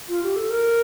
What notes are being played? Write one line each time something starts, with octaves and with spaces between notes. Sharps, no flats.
F4
G4
A4
A#4